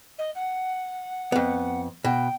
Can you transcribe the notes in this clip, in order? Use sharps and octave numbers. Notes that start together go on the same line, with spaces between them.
D#5
F#5
F2 B3
B2 G5